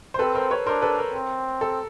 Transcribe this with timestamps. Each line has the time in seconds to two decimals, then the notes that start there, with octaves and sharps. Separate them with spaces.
0.14 C5
0.19 C4 A4 B4
0.35 A#4 C5
0.51 B4 C#5
0.66 D4 A#4 C5
0.82 A4 B4
0.98 A#4
1.14 C4
1.61 A4